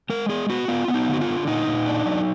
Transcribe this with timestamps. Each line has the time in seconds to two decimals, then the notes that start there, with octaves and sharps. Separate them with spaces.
0.09 G#3 A#4
0.29 B3 G#4
0.50 B3 F#4
0.68 B3 F4
0.88 B3
0.94 D#4
1.08 D3
1.13 F#4
1.21 F4
1.27 D3
1.47 A#2 D#4
1.67 A#2
1.86 D4
2.06 F#3